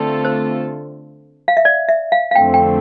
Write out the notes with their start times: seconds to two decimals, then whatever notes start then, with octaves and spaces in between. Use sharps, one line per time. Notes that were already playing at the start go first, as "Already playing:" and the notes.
Already playing: D3 A3 C4 F4 A4
0.25 C5
1.48 F5
1.57 E5
1.65 D5
1.89 E5
2.12 F5
2.31 F5
2.35 F2 D3 F3 A3 C4 G5
2.54 G5